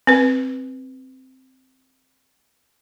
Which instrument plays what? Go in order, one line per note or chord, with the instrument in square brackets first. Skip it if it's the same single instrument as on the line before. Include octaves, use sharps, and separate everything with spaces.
[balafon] C4 B4